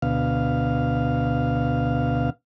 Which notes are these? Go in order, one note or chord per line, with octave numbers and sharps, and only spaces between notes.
D2 B2 F5